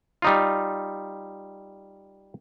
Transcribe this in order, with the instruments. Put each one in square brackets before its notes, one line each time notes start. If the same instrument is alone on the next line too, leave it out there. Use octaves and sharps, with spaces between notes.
[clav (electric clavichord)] G3 D#4 F4